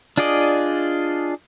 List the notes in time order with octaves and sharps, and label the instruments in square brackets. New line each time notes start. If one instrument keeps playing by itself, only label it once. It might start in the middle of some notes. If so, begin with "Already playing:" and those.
[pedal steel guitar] D4 F4 G#4 D5 D#5